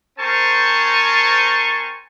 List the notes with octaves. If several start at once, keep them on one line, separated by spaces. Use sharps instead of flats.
C4 A#4 C5 G#5 A5 C#6